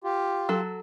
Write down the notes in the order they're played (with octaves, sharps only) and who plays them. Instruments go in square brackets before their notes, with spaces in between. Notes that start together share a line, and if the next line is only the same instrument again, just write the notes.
[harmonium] F4 G4
[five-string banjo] F#3 A4